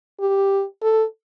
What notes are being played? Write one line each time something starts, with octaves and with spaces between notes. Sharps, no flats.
G4
A4